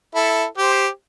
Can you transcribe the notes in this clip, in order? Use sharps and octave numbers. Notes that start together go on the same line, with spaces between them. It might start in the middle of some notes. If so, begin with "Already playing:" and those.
E4 A4
G4 C5